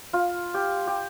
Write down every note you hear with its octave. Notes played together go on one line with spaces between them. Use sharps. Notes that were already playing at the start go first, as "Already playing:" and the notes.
F4
G4
G4